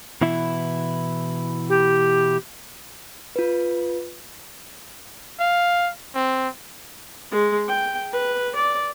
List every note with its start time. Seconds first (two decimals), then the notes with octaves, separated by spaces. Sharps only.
0.21 B2 E3 E4
1.69 G4
3.36 F4 B4
5.40 F5
6.15 C4
7.31 G#3
7.68 G5
8.13 B4
8.55 D5